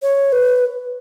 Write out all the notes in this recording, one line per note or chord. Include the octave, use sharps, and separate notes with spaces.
C#5
B4